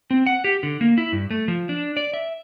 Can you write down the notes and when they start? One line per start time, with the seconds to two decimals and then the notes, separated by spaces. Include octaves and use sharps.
0.11 C4
0.26 F#5
0.44 G4
0.63 D3
0.81 A#3
0.98 E4
1.12 G2
1.31 A3
1.48 F3
1.69 D4
1.97 D5
2.14 E5